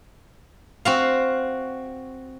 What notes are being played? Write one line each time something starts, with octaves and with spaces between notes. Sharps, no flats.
C4 F#4 F5